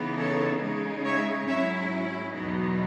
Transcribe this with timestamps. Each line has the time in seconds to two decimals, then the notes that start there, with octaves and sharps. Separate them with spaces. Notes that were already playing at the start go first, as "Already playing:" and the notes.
Already playing: C#3 E3 B3 D#4
0.18 A4 C#5
0.62 C#3 G#3 D#4
1.05 C#5 E5
1.47 G#2 F#3 C#4 E4 C#5 E5
2.33 E2 B2 F#3 B3 D#4